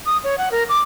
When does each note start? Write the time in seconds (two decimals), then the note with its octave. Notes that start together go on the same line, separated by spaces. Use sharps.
0.06 D#6
0.24 C#5
0.38 F#5
0.52 A#4
0.69 D6